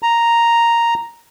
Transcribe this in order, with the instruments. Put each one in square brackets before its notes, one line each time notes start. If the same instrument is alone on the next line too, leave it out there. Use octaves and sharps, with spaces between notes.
[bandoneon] A#5